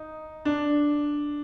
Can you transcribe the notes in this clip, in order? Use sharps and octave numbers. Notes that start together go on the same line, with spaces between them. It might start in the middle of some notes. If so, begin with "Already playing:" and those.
Already playing: D#4
D4